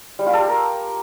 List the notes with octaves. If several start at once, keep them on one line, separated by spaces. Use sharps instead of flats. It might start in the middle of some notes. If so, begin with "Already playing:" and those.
G3
F4
A4
G4
A#4